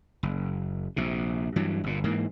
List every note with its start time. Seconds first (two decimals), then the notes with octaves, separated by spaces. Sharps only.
0.23 F#1
0.96 A#1 C3
1.56 G2 E3 F#3
1.84 G1 A#2
2.04 G#2 E3 A#3